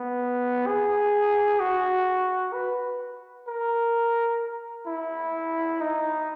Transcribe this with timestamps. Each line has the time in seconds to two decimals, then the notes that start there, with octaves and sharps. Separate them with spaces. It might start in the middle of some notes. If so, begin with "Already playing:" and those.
Already playing: B3
0.67 G#4
1.60 F#4
2.53 B4
3.48 A#4
4.87 E4
5.81 D#4